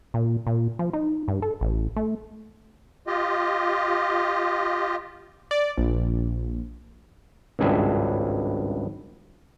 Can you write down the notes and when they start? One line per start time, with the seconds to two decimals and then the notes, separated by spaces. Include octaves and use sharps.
0.14 A#2
0.47 A#2
0.79 F3
0.93 D#4
1.28 G2
1.42 A4
1.61 A1
1.96 A3
3.07 F4 G4 D#5
5.51 D5
5.78 A#1
7.59 G#1 C#2 G2 G#4 E5